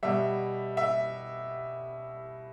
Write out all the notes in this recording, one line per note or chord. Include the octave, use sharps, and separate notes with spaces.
B2 G3 E5
E5